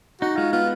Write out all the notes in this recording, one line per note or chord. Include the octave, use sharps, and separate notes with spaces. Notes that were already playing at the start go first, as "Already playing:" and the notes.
D#4 F#4
G#3 F4
B3 F4